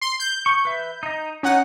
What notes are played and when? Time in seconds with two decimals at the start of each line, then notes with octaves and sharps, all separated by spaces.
0.01 C6
0.20 G6
0.46 C#6
0.65 B4 E5
1.03 D#4 D#5
1.43 C#4 D#4 F#5